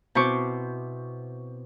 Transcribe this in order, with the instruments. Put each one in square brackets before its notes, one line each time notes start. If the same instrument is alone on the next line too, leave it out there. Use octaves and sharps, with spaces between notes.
[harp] B2 C4 E4 C5 C#6 D6